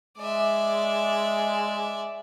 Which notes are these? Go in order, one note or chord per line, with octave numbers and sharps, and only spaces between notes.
G#3 D5 E5